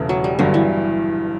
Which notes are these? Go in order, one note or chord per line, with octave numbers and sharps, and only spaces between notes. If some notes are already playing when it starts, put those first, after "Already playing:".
Already playing: E1 E2 C#3 E3 A3 B3
F#3
G3
G1 G2 D3 F#3
E3